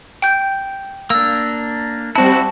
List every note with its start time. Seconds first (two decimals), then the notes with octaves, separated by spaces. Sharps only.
0.22 G5 G6
1.10 A#3 D4 E6
2.16 G3 C4 E4 F#4 A5 F#6